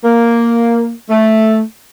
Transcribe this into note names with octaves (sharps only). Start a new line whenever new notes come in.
A#3
A3